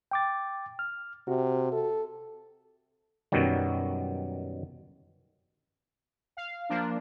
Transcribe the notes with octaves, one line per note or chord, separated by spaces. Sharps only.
G5 D6 A6
F6
C3 F#4
A4
F#2 B2 D#3 F#3 G3
F5
F3 A#3 D4